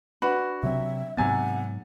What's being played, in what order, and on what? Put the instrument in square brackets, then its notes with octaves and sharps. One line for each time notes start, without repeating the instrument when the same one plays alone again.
[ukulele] D4 B4 B5 [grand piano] F#4
[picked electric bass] C3 F#3 C4 [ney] E5
[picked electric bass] G#2 F#3 B3 [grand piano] C3 G#5 A6 [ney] F#5